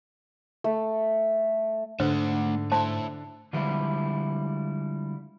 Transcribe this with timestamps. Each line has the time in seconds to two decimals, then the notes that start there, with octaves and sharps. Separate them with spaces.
0.64 A3
2.00 G#2 D3 A3 B4 C5 F#5
2.72 A3 E4 C5 A5 C6
3.53 D3 F3 G3 G#3 E4